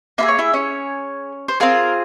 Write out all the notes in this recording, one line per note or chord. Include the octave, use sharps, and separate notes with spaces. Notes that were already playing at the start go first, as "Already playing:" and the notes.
A#3 E4 G#4 E5
C#5
E4 E5
C#4 C#5
C5
C4 F4 G#4 A#4